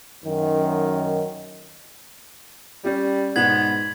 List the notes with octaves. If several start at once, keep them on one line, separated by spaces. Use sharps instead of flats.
F#2 D#3
G3 C#4 G4
G#2 B2 B3 G#6 B6 F#7